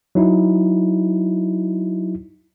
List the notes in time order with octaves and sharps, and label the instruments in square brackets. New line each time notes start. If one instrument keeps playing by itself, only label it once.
[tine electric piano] F#3 D#4 E4